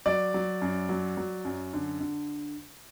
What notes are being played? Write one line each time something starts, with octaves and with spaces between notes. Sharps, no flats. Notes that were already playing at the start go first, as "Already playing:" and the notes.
F#3 D5
F#3
F#2
F#3
F#3
F#2
D3
D3